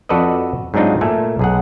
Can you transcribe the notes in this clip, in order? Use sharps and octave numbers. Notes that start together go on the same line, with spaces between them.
F2 F#4 A4 B4 D5 D#5
G#2 F#3 C4 D4 D#4 F4
A#2 A3 A4 A#4 G#5
B1 G#4 F#5